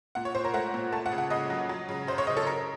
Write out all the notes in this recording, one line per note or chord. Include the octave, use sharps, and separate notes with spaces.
A#2 F#5
C#5
A#2 C5
A#4
A3 F#5
A#2
A3 A5
F#5
C#3
F#5
C#3 D#5
F#3
F#3
C#3
F#2 C5
C#5
C#3 D#5
A4
C#3 A#4